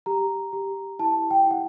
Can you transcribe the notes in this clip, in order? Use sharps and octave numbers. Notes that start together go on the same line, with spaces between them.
G4 A#5
G4
E4 A5
G5
E4 F#5